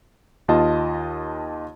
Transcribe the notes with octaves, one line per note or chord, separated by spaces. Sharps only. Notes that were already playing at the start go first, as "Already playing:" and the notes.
D#2 F4 D#5 A5